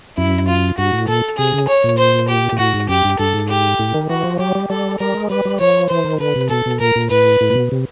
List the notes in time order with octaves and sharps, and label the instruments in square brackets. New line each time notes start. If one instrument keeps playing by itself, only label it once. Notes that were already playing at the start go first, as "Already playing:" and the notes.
[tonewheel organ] F#2 [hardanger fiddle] E4
[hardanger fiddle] F4
[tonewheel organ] G2 [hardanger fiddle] F#4
[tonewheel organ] A2
[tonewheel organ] A#2 [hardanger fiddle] A4
[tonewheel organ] C3 [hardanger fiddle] G#4
[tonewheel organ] C#3
[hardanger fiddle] C#5
[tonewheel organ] A#2
[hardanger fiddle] C5
G4
[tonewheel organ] A#2
[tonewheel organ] A2 [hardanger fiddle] F#4
[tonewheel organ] G#2
[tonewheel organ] F#2 [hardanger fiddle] G4
[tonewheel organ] G2
[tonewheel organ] G2 [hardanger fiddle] A4
[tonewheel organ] G#2
[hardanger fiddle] G4
[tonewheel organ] A2
D#3
[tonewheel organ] E3 [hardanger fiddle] F#4
[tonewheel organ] F3
[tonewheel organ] F#3 [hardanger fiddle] G4
[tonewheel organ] G3
[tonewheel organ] G3 [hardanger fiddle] A4
[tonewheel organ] G3 [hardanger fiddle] A#4
[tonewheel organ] G#3
[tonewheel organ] G3 [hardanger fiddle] B4
[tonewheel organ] G3
[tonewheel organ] F3 [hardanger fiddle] C#5
[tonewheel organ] E3 [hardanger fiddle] C5
[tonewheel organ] D#3
[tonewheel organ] D3 [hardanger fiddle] B4
[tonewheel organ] C3
[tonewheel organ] B2 [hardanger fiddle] A4
[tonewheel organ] B2
[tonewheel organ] A#2 [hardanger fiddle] A#4
[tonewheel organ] A#2
[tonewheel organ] A2 [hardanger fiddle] B4
[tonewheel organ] A2
A#2
B2
C3